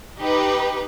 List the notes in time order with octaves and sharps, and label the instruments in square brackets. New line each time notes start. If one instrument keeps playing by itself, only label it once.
[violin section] D#4 G4 B4